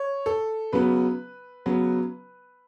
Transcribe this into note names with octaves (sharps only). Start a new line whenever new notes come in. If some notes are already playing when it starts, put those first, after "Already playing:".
Already playing: C#5
A4
C#3 F#3 B3 B4
C#3 F#3 B3